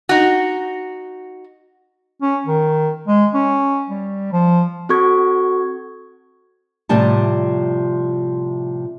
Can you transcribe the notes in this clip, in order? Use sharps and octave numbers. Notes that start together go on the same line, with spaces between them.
D#4 F#4
C#4
D#3
G#3
C#4
G3
F3
C4 F#4 A4 C#6 G#6
A2 C3 F3 G3 A5